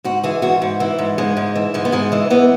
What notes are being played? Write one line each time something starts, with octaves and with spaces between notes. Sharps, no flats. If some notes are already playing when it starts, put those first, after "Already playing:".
G#2 F#4
E3 G#4
G#2 F#4
G#2
E3
G#2
G#2 G#3
G#2
E3
G#2 G#3
B3
G#2 G#3
E3 G#3
E3 B3